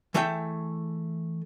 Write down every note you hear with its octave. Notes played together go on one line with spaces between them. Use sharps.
E3 A3 G#4 E5 G5